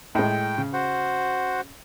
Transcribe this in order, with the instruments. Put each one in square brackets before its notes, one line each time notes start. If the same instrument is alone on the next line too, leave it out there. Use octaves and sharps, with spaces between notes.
[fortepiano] A2 G#3 [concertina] G5
[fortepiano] C#3
[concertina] F#4 C5 F#5